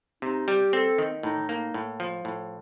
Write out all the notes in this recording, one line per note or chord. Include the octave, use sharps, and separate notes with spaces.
C3 D#4
G3 G4
C4 A4
D#3
A2 D#4
A#3 D#4
A2
F3
A2